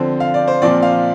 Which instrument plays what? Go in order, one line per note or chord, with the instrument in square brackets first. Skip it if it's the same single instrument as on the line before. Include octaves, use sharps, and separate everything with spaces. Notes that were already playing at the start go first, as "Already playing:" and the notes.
Already playing: [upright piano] D3 F3 C4 C5
F5
D5
C5
A#2 F3 C4 D5
F5